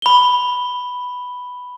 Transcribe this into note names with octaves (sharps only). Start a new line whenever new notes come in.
B5 G7